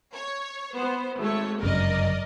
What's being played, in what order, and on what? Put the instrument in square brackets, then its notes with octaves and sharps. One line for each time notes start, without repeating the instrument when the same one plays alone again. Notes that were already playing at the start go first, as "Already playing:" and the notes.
[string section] C#5
B3 C5
G#1 A3 C#5
[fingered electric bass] G1 F#2 C#3 [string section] A#4 D5 D#5